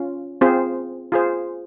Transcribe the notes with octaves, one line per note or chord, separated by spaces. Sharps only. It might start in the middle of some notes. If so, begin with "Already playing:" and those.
Already playing: C#4 F4
C4 F4 G#4 C5
F4 G#4 C5